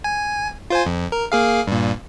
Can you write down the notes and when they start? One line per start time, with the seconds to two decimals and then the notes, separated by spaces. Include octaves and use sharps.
0.04 G#5
0.70 F4 C5 G#5
0.86 F2
1.12 A#4
1.32 A#3 G#4 F5
1.68 G2 A#2